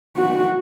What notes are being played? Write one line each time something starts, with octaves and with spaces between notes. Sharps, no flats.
F#4